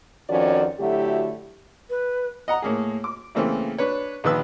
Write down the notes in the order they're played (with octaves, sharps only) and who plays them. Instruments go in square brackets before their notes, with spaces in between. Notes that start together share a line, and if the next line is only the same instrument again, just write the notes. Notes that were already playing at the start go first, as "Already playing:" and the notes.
[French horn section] F2 D#3 F3 C#4 F#4 D5
D3 F#3 A3 E4 F#4 G4
[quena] B4
[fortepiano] D#5 F#5 A#5
A2 A#3 G#4
D6
C#3 E3 A3 A#3 C4
D4 B4 C#5
A#1 D#3 B4 E6